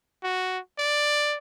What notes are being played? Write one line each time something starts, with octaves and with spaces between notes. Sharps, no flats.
F#4
D5